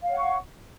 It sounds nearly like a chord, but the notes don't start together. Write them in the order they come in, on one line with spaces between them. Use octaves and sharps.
F5 C#5 F#5 C#6